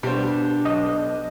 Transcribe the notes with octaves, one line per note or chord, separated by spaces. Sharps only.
B2 G3 D4 C5
B1 D#5